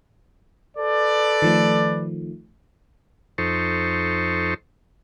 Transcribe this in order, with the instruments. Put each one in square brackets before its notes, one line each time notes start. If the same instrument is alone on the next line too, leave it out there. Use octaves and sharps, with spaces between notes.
[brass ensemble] A4 B4 D5
[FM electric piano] D#3 F3 A3
[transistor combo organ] F2 D#4 A4 C5 C#6